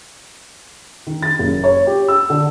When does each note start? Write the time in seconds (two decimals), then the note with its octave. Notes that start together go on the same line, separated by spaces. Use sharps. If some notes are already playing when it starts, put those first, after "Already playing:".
1.07 D#3
1.22 A6
1.39 F#1
1.64 C#5
1.87 G4
2.08 E6
2.30 D3